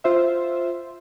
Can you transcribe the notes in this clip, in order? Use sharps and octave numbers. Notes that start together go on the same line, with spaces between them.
F4 C5 E5